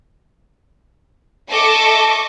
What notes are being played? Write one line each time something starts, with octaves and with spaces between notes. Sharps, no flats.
A4 D#5 E5 C#6 D6